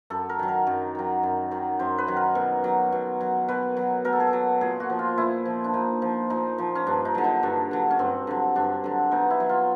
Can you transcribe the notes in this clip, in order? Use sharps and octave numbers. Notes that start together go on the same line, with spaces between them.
F#2 A4
A#4
D#3 F#3
A#4
F#2
D#3 F#3
F#2
D#3 F#3
F#2 C5
B4
D#3 F#3
A#4
B2
F#3
B2
F#3
B2 B4
F#3
B2 A#4
A4
G#4
A4
F#3
A#2 G#4
F#4
F3
F4
A#2 E4
F3
D4
A#2 D#4
F3
A#2 D#4
F3
C#4
G2 D4
D#4
D3 F#3
D#4
G2 D4
D3 F#3
C#4
G2 C4
D3 F#3
G2 D4
D3 F#3
B2 D#4
E4
F#3
F4